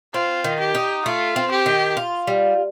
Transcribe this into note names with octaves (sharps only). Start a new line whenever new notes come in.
C4 F4
D#3
G4
D#4
A3 F4
C4
G4
D#3
F4
G3